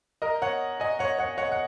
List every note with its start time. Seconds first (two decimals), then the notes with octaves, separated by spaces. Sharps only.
0.22 A#4 D#5
0.42 C#5 F#5
0.80 D#5 G#5
0.99 C#5 F#5
1.19 C#5 F#5
1.38 C#5 F#5
1.52 F#5